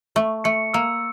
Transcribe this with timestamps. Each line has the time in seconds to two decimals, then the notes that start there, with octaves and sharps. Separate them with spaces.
0.16 A3 C#6
0.44 A3 C#7
0.74 A#3 E6